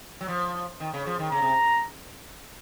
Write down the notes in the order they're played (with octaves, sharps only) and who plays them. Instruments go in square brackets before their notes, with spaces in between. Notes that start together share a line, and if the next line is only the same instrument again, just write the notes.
[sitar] F#3
F3
D#3
C#3
F3
D#3
[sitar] C#3 [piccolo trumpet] A#5
[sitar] C3